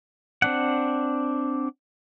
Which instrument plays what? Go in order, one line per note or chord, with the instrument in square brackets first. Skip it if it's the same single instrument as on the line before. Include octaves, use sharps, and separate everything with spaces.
[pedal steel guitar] C4 D4 F#5